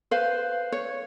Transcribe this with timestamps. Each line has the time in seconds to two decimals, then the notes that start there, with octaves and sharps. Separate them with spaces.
0.11 B4 C5 F5
0.72 C#5